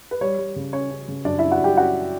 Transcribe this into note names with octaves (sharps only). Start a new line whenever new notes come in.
B4
G3 C#5
G3
C#3
C#4 C#5
C#4
C#3
F#2 D4 D5
E4 E5
C#4
F#4 F#5
F#2 G4 G5
C#4 F#4 F#5